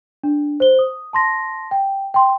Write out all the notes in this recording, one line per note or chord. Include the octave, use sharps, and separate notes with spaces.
D4
C5 G7
D#6
A5 C6 A#6
G5
G5 C6